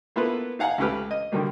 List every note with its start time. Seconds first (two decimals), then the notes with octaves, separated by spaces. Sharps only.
0.16 A#3 B3 E4 F4 A4 B4
0.59 D#4 F5 F#5 G#5 A#5
0.78 C#2 C#3 A3 G4 B4 F6
1.11 D#5
1.32 D3 D#3 F#3 G3 A#3